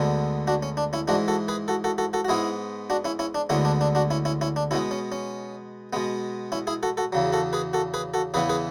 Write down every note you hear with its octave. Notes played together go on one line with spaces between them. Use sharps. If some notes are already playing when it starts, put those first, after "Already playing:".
Already playing: D2 D3 G#3 B3
D4 F#4
C#4
D4
C#4 E4
G#2 E3 G#3 D4 F#4
F#4 A4
G#4 B4
F#4 A4
F#4 A4
F#4 A4
F#4 A4
F#4
G#2 G#3 B3 E4 G#4
D4 F#4
C#4 E4
C#4 E4
D4
D2 D3 G#3 B3 C#4 E4
D4
D4
D4 F#4
C#4 E4
C#4 E4
C#4 E4
D4
B2 G#3 B3 C#4 E4
C#4
C#4
B2 G#3 B3
C#4 E4
E4 G#4
F#4 A4
F#4 A4
E2 C#3 F#3
F#4 A4
G#4 B4
F#4 A4
G#4 B4
F#4 A4
E2 C#3 E3 B3 G#4 B4
G#4 B4